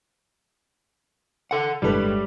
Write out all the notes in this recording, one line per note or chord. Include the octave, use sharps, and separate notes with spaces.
A4 F#5
G1 A2 D3 G3 G#3 A4 B4